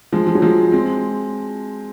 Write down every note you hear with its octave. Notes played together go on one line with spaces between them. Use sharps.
F3 G#3
F3
F#3
F3 G#3
G#3 C4